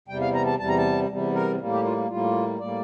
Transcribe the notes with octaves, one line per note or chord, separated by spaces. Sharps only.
E2 C3 G3 G5
F5
A#5
A5
E2 C3 G3 A5
A#5
A5
E2 C3 G3
A#4
A2 G3 A#3
G4
F4
A2 G3 A#3 F4
A2 G3 A#3 D5